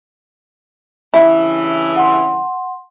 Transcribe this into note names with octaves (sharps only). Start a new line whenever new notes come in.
G2 C#3 E3 E4
F#5 C6